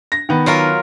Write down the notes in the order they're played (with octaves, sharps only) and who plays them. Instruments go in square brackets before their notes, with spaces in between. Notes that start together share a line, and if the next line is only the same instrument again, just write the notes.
[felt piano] A#6
D#3 B3
[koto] F#3 F4 A#4